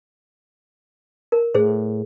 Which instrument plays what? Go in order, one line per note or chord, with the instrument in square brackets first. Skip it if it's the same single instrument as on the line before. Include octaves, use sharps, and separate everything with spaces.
[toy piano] A#4
[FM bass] A2 [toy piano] G#4 C5